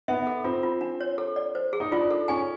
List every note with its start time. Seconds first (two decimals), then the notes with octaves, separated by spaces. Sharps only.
0.08 B3 E5
0.27 A4
0.44 C4 F4
0.63 F4
0.81 D4
1.01 C#5
1.18 A4
1.36 D5
1.55 C5
1.73 G#4
1.80 D#4
1.91 D4 F4
2.11 A4
2.28 C#4 G#5